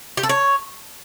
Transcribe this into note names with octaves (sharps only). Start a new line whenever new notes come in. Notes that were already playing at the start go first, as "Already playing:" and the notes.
G4
A4
C#5